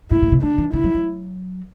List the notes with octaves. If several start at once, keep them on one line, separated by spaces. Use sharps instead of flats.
A2 E4
A2
C3
D3 D4
E3
D3 E4
F#3
F#3